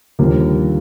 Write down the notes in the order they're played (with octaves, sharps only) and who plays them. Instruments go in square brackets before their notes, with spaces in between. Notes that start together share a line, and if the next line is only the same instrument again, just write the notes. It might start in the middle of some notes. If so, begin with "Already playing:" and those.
[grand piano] D#2 D3 F3 G3 A#3